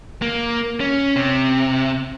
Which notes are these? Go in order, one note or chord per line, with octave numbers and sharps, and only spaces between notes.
A#3
C#4
C3